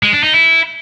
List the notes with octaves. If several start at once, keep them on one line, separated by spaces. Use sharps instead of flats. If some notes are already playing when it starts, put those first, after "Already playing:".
G#3
D4
D#4
E4